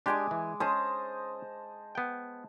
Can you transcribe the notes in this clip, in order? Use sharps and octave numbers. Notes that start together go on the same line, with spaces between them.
G#3 D4 G4 G#5 D6
E3
C#4 G#4 C5 D#5 A5
B3 G5